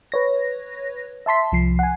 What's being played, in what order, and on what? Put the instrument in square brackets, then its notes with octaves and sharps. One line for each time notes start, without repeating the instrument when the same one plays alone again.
[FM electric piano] B4 C#5 A#6
E5 A5 C6 B6
C2 F3 C7
F#5 G#5